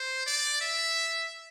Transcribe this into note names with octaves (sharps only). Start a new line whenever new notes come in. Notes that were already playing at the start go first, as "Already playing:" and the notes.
Already playing: C5
D5
E5